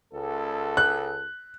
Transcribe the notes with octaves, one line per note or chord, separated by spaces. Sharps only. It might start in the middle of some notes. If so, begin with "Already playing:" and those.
C#2 A4
F#6